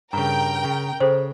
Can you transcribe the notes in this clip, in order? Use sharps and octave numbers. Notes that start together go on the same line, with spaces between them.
G2 C#3 A#4 G5 A#5
C#3
C#3 A4 C5